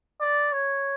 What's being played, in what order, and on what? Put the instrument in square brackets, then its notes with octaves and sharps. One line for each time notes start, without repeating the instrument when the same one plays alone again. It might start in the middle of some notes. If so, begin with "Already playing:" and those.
[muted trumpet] D5
C#5